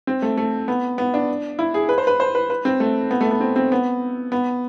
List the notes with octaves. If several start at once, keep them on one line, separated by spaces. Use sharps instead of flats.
C4
A3
A3
B3
B3
D4
E4
G#4
B4
C5
B4
C5
B4
B4
C4
A3
B3
A3
B3
C4
C4
B3
B3